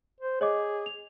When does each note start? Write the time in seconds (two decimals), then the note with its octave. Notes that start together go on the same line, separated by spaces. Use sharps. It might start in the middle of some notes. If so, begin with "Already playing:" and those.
0.20 C5
0.41 G#4 C#5 D#5 D6
0.86 F7